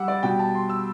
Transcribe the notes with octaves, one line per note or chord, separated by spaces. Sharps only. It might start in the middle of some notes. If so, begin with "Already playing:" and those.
Already playing: G3 F#5 D6 E6
D5
B2 G3 G5
A5
C6
E6